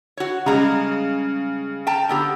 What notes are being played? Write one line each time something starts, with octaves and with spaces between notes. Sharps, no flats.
F#4 C#5
C#3 G3 G#3 A#5
G5 A5 A#5
D3 B3 G4